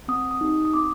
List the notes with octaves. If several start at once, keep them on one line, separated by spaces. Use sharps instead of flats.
C4 D#6
D#6
D#4 G4
D#6
C4 D6